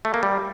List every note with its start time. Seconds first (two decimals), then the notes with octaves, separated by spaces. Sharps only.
0.05 A3
0.14 A#3
0.23 G3